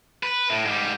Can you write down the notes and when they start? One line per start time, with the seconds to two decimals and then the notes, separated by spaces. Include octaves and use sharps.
0.23 B4
0.50 A2
0.65 G#2 G3